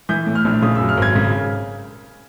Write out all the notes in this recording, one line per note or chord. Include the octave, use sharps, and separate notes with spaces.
E3 G6
A2
F6
A#1
C#3 D#6
F#2 E6
F6
G#1 G#6
C#3